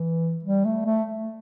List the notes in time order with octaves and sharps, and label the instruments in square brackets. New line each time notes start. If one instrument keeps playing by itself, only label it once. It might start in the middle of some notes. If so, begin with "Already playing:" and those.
Already playing: [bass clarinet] E3
G3
A3
A3